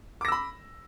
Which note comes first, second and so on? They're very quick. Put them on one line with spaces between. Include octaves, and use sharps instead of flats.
D6 A#6 E6 B5